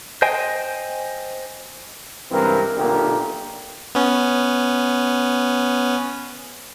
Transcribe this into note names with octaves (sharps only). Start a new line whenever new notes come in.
C5 D#5 G5 G#5
C#2 G2 E3 C4 A#4
B1 A#2 D3 G4 A#4
B3 C#4